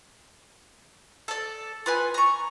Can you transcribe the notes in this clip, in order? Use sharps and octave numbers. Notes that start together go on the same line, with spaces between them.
A4 D5
F4 B4 G#5
A#5 C#6